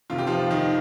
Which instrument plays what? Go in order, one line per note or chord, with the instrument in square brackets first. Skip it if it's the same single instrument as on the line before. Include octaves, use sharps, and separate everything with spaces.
[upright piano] F1 F2 C3 D#3 F4
G4
F3 F4
D#3 D#4